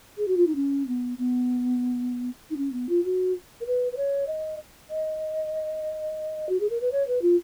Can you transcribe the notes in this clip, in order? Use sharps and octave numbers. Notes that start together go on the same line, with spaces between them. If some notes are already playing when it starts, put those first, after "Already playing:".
G#4
F#4
F4
D#4
C#4
B3
B3
D#4
C#4
B3
F4
F#4
A#4
B4
B4
C#5
D#5
D#5
F#4
G#4
A#4
B4
C#5
B4
F4